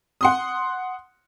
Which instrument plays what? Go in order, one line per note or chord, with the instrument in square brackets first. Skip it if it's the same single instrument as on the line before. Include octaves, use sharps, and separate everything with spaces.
[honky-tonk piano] F#5 C6 D#6